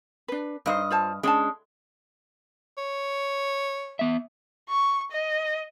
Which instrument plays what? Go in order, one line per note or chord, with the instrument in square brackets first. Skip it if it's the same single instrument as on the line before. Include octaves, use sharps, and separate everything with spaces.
[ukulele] D4 B4
[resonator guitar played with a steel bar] G2 D#5 [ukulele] D#4 C5
[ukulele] F4 C5 A5
[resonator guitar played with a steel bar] G#3 [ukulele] C#4 D4 A5
[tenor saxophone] C#5
[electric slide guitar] B3 E5
[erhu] C#6
D#5